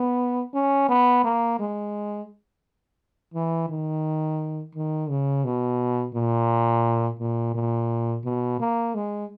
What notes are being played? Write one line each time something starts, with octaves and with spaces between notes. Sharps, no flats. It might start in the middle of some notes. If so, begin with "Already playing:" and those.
Already playing: B3
C#4
B3
A#3
G#3
E3
D#3
D#3
C#3
B2
A#2
A#2
A#2
B2
A#3
G#3